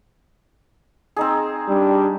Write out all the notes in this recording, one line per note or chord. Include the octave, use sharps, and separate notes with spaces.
C4 D#4 G#4
G3 D4